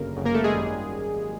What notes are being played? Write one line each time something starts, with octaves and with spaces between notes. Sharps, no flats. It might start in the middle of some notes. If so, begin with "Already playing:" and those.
Already playing: G1 F#2 C#3 A#3 A#4
G1 F#2 C#3
A#3 A#4
A3 A4
G#3 G#4
G#1 F#2 D#3 G3 A#3